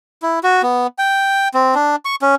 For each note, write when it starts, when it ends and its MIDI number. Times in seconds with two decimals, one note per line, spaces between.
0.22 0.39 64
0.43 0.62 66
0.63 0.87 59
0.98 1.48 79
1.54 1.75 60
1.75 1.96 62
2.05 2.16 85
2.22 2.35 61